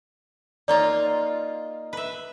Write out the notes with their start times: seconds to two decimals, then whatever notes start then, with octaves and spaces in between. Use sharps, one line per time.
0.68 A#3 D#4 F4 D5
1.93 B4 E5